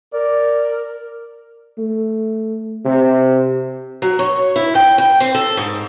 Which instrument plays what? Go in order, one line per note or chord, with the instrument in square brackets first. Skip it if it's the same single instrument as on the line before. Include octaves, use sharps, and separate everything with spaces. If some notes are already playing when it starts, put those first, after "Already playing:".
[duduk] A#4 [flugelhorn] D5
[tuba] A3
C3
[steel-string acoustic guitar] F#3
C#5
E4
G5
G5
C4
A4
G#2